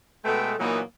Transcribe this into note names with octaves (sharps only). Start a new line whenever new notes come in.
B2 G#3 A3 A4 B4 G5
A#2 E3 F#3 A#3 B3 D#4